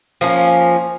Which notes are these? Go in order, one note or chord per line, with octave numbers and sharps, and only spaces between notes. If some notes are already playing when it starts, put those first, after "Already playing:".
F3 A#3 C#4